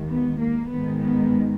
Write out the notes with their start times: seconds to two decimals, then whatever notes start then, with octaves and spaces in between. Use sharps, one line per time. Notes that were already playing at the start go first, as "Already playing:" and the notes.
Already playing: D#2 D#3 G#3
0.10 B3
0.40 A#3
0.70 G#2 D#3 G#3 B3
1.00 B3